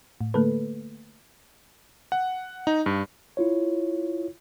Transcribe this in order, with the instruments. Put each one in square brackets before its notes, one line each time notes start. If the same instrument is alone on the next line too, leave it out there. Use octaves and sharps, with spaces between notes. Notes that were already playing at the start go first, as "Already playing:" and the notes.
[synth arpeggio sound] A2
D3 A3 A#3 A4 B4
[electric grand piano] F#5
D#4
G2
[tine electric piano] E4 F4 C#5